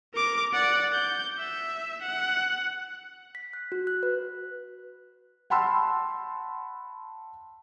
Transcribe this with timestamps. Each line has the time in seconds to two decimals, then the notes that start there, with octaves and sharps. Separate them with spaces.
0.14 A#4 D6
0.53 D5 F#5
0.94 G6
1.39 E5
2.02 F#5
3.35 B6
3.53 F#6
3.72 F#4
3.87 F#6
4.03 B4
5.50 F#5 A5 B5 C6 E6